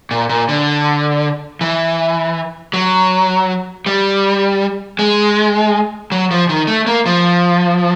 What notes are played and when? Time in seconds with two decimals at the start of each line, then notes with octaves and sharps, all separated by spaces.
0.11 A#2
0.29 A#2
0.49 D3
1.61 E3
2.73 F#3
3.86 G3
4.99 G#3
6.12 F#3
6.31 F3
6.49 D#3
6.67 A3
6.86 A#3
7.06 F3